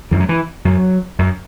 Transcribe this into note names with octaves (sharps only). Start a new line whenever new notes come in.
F#2 E3
F#3
E3
F#2 F#3
F#2